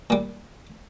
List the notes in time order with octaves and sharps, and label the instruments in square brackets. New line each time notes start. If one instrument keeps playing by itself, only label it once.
[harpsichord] A#2 G3